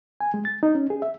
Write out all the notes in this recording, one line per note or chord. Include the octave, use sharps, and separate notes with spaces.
G#5
G#3
A6
D#4
C#4
G#4
E5